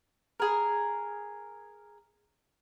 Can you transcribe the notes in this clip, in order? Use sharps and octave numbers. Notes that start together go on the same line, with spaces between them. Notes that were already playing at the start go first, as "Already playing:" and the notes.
G#4 A#4